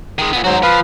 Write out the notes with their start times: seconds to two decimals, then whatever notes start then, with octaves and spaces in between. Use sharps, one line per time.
0.18 D#3 G#3
0.33 A#2 B3
0.44 G#2 F#3 F#4 C5
0.63 F3 B4 F5